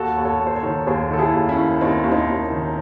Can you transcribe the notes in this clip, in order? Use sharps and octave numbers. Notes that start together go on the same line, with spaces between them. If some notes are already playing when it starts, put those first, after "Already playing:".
Already playing: D#2 F#4 A4
D#2
A4 C#5
D#2
C5
A4 C#5
D#3
D#2 G#4 C5
D#3 A4
E4 G#4
D#2
C#4 E4
D#2
D#2 C4 D#4
D#2
C4 D#4
D#2
D#3